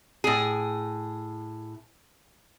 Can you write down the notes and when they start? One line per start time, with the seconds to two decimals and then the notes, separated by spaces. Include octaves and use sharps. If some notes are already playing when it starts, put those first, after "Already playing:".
0.24 A2 G#4